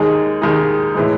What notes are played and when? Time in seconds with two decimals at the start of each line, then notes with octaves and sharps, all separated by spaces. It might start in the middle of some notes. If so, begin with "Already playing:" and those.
Already playing: D#2 D#3 G#3 D#4 G#4
0.41 D#2 D#3 G#3 D#4 G#4
0.95 A2 E3 G#3